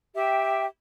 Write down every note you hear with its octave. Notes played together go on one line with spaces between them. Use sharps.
G4 E5 G5